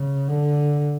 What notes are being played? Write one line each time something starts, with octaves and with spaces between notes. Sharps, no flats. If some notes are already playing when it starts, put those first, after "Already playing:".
Already playing: C#3
D3